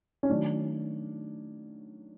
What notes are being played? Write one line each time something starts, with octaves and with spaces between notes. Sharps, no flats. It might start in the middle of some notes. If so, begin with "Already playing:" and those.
C#4
D#3 F#3 A3 D4